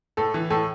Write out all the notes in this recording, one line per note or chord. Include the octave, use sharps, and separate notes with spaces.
A2 A4
E3
A2 A4